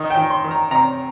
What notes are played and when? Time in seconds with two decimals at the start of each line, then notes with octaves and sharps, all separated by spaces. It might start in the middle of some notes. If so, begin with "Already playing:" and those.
Already playing: D#3 D#5
0.10 G5
0.17 D#3
0.30 C6
0.44 D#3
0.51 A#5
0.71 C3 A#5